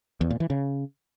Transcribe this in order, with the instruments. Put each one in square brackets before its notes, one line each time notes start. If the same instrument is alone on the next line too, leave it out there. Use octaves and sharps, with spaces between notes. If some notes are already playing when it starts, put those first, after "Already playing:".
[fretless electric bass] E2
A#2
E3
C#3